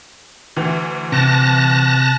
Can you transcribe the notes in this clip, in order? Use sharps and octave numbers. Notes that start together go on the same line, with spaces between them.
D2 E3
C3 A5 F#6 A#6